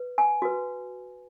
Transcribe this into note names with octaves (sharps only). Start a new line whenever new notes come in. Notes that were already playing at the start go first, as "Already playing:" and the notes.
Already playing: B4
G#5
F#4 B4